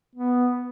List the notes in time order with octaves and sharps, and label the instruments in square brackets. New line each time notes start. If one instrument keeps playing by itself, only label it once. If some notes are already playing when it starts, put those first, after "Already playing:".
[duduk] B3